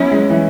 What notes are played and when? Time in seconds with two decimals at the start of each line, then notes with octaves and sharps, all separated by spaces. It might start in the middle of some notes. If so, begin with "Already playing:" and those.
Already playing: F#3 B3 C#4 E4
0.12 G#3
0.30 E3